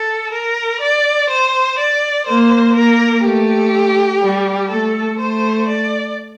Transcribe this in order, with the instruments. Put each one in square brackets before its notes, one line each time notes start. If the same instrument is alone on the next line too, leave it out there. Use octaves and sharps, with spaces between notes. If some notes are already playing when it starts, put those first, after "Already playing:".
Already playing: [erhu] A4
A#4
D5
C5
D5
[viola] A#3 [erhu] C5
[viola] A#3 [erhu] A#4
[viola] A3 [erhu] G4
[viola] G3
[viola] A3 [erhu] A4
[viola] A3 [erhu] C5
[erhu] D5